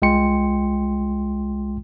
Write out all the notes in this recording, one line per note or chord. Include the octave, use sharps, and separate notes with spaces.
C2 G#3 F4 G5 C6 C#7